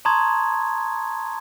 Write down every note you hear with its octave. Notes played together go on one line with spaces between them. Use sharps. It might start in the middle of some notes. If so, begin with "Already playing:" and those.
A5 A#5 C6 C#6 D#6 G#6